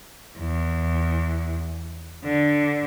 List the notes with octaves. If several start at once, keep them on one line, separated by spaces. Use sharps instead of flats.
E2
D3